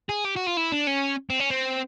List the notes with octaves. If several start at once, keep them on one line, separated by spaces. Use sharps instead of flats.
G#4
G4
F#4
F4
E4
D4
C#4
C4
C#4
C4